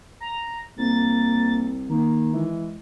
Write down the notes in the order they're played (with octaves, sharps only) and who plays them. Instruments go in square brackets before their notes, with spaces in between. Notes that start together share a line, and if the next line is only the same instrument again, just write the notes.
[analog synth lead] A#5
[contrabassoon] C2 [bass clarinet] A#3 [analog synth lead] A6
[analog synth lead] D#3 [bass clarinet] A#3
[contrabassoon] E3 [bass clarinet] G#3